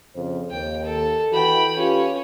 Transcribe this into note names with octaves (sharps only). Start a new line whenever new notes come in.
F2 C#3 C5
D#2 G5
A4
E3 F#4 G5 B5
C#4 F4 G4 B4